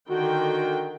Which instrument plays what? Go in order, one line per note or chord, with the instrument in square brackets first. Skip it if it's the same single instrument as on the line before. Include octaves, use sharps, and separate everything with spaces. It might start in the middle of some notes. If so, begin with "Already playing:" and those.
[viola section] D3 D#3 G5 [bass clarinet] F#4